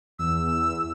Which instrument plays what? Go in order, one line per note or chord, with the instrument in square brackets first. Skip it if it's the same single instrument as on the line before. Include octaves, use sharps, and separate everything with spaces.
[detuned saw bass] E2 [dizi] E6